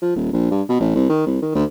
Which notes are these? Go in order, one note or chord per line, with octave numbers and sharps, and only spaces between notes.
F3
D#1
A#1
G2
B2
A1
C2
D#3
C2
D#3
D2